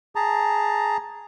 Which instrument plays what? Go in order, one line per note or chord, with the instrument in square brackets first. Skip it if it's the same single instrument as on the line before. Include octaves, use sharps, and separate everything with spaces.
[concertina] G#4 A5 A#5